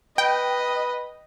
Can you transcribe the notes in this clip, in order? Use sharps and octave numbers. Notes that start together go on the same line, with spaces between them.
B4 D#5 G5